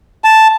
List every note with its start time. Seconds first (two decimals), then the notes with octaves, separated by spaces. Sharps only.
0.24 A5